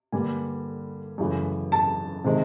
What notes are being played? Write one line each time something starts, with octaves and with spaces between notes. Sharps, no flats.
G2 D3 G3 A#3 G#5
F#2 C#3 E3 A3
A5
C3 D#3 G#3